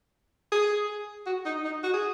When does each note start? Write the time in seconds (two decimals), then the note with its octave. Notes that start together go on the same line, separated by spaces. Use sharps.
0.52 G#4
1.26 F#4
1.46 D#4
1.65 D#4
1.83 F#4
1.94 G#4